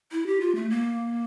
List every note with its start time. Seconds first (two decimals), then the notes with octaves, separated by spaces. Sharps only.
0.12 E4
0.26 G4
0.40 F4
0.55 A3
0.70 A#3